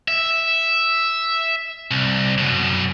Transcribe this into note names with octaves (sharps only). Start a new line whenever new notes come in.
E5
C2
F#2 B2